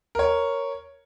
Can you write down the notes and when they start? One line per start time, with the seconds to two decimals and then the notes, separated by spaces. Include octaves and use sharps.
0.15 A#4 C#5